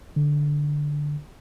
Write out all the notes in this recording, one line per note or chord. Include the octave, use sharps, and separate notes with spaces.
D3